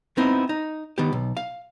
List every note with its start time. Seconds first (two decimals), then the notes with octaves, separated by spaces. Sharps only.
0.17 B3 C4 D#4 E4
0.49 D#4
0.98 D#3 B3 G4
1.13 B1
1.37 F5